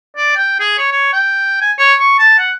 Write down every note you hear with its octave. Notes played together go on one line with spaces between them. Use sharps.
D5
G5
G#4
C#5
C#5
G5
G#5
C#5
C#6
A5
F#5